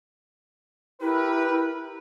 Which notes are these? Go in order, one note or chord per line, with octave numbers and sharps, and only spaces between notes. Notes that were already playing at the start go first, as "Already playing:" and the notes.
E4 G4 A#4 B4